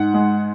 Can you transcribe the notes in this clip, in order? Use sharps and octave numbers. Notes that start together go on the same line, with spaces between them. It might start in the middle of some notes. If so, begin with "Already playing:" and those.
Already playing: G#2 F#5
G#3